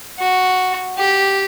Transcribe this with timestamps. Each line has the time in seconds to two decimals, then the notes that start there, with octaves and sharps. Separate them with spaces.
0.19 F#4
0.97 G4